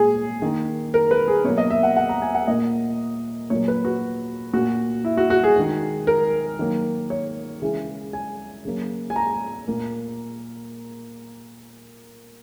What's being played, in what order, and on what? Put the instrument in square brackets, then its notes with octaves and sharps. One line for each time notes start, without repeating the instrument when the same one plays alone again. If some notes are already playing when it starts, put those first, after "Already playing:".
Already playing: [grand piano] A#2 G#3 G#4
D#3 A#3
A#4
B4
G#4
B2 F#3 A#3 C#5
D#5
E5
F#5
F#5
A#5
G#5
F#5
A#2 A#3 D#5
A#2 F#3 A#3 C#5
B4
F#4
A#2 A#3 F#4
E4
F#4
F#4
G#4
D#3 G#3
A#4
D#3 F#3 A#3
C#5
C#3 E3 G#3
G#5
C#3 F#3 A#3
G#5
A#5
A#2 A#3